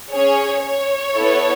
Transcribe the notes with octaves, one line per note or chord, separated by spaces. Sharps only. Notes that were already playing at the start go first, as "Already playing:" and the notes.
C#4 G#4 C#5
C#5
B3 E4 A4